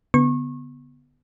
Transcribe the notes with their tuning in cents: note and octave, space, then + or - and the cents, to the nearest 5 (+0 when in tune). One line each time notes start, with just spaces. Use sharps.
D3 -35 B3 +0 C#6 -30